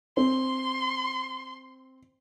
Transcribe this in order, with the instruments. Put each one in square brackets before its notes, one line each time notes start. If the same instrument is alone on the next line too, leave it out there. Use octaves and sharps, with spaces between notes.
[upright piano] C4 [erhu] C6